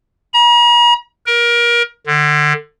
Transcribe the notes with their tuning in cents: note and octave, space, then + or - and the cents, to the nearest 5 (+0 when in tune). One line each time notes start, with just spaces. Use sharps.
A#5 +45
A#4 +25
D3 +25